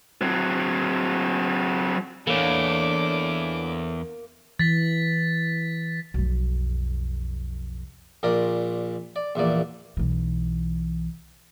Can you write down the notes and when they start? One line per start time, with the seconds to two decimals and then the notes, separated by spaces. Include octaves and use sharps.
0.22 F#3 C4
2.27 E2 E3 A#3 D4 A4 C#5 D6
4.59 E3 A6 B6
6.14 B1 F2
8.23 A#1 A#2 A#4 D5 D#6
9.16 D5
9.35 A#1 E2 A#3 D5
9.97 B1 E3